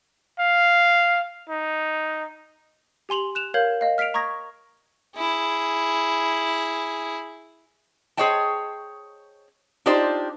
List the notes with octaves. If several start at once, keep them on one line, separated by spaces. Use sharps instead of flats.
F5
D#4
G4 G#5 C6 F7 F#7
F#6 E7 F7
A#4 C#5 F5 G6 G#6 F#7
D#5 F5
F6 B6 C7 D7 F7
A#5 C#6 D#6 G#6 A#6
E4 G#4
G#4 C5 C#5 D#5 G5 A5
D4 D#4 F4 G4 C5 D5